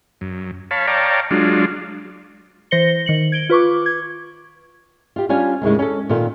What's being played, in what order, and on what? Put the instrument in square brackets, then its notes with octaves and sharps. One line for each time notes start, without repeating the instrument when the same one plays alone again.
[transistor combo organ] F#2
C#5 F5 A5 B5
C#5 D5 F5 G5 A5 A#5
F#3 G#3 D4 F4
[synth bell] E3 C5 A#6 C#7 G7
D#3 C#7 F#7
G#6 D7 G7
F4 B4 C#6 D6
G#6
[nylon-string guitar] F4 G4
G3 C#4 D4 F4 G#5
D#2 A2 C#3 G#3
C#4 A4
A#2 D#3 F4 A4